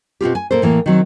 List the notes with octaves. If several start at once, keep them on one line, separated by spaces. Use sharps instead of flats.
B2 C4 F4 G4
G#5
A#2 A#3 A4 C5
A2 E3 A#3
D#3 F#3 C4